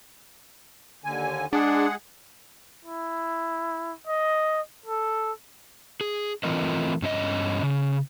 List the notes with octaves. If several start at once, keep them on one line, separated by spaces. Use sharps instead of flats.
D#2 D3 G#5
G#3 D4 G#4 F#5
E4
D#5
A4
G#4
E3 A3 C4 F4 A#4 D#5
G2 C#4 G#4 D#5
C#3